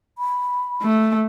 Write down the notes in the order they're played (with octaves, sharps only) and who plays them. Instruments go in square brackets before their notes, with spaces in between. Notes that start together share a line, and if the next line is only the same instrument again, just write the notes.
[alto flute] B5
[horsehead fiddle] A3